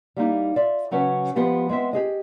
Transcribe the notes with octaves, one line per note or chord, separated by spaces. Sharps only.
G3 A#3 D#4 E4
F4 D5 E5
C#3 F#3 C#4 B4 E5
F3 G#3 B3 F4 G4
G#3 B3 C4 E5
G4 G#4 D#5